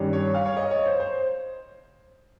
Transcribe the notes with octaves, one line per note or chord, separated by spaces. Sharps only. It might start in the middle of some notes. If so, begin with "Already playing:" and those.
Already playing: G2 D#3 G3 C#4
C#5
F5
C#5
D#5
C#5
C5
C5